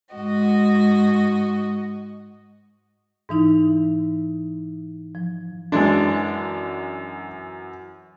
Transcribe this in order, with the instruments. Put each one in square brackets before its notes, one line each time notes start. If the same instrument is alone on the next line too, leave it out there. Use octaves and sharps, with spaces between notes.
[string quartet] G#2 F#4 D#5
[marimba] G#2 E3 D#4 E4
F3
[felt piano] F#2 E3 [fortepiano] G#3 D4